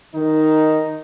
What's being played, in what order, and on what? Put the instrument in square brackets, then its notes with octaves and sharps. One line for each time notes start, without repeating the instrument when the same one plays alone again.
[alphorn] D#3 [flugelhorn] D#4